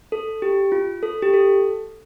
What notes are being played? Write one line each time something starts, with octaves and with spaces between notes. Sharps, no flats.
A4
G4
F4
A4
G4
A4